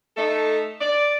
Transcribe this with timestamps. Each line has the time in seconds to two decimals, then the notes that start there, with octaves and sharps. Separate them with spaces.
0.17 A3 D#4 A4
0.81 D5